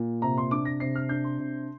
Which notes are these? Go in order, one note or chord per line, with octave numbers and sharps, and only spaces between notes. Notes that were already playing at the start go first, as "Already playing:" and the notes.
Already playing: A#2
C3 A#5
C6
D4 D6
A#6
C3 C7
F6
D4 G6
C6
C3